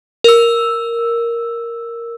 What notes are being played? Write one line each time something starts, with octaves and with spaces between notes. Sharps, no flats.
A#4 E6